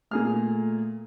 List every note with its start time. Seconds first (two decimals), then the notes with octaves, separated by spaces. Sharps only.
0.11 A#2 A3 G#4 F6